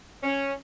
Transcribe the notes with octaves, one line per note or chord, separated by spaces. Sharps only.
C#4